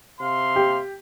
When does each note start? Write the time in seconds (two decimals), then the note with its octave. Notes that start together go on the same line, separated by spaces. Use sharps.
0.20 C3 F5 C6
0.56 G4